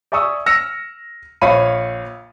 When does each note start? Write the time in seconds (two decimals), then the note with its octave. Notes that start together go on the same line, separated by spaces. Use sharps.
0.12 D5 E5 G#5 C#6 D#6 E6
0.46 E6 F6 A#6 C#7 E7
1.41 A#1 C#5 F5 B5 B6 D#7